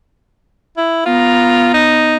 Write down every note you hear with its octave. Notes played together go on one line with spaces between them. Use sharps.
E4
B3 F4 A#5
D#4